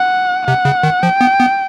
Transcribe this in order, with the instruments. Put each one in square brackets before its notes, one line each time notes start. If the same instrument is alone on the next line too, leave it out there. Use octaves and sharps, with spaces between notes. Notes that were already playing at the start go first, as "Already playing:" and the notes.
Already playing: [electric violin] F#5
[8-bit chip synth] C3 [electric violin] F#5
[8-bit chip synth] C#3
D#3
[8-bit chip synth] F3 [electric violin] G5
[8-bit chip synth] B3
B3